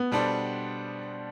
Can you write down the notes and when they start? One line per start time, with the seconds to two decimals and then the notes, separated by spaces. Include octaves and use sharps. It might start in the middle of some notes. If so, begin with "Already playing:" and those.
Already playing: B3
0.12 B2 G3 D4 A4 C5